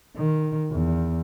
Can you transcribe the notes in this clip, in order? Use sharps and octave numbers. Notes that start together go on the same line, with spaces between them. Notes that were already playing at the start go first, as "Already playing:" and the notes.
D#3
E2